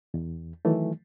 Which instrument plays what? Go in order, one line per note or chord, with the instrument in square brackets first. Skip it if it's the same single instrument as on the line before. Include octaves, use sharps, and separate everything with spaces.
[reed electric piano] E2
D#3 E3 F#3 A3